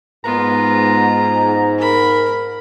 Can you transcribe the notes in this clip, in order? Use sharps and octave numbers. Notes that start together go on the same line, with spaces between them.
G#2 B3 F4 A#5
A#4 B5